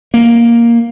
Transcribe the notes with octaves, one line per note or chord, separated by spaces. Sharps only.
A#3